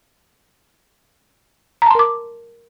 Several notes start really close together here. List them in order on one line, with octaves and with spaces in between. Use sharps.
A#5 A5 C6 A#4 D6